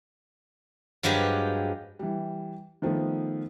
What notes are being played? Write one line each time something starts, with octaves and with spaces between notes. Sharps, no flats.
G2 F3 F#3 G#3 G4
E3 G3
D#3 F3 A3 B3